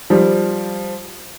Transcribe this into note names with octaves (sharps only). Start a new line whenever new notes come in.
F3 G3